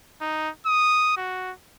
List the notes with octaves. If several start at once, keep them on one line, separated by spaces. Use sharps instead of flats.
D#4
D#6
F#4